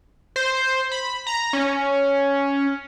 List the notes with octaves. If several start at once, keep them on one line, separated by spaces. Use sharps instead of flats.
C5
B5
A#5
C#4